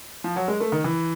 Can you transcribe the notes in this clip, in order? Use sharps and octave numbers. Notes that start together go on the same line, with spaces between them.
F3
F#3
G#3
A3
D#3
E3